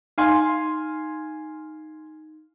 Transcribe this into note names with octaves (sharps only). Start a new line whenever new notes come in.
D#4 F5 G#5 C6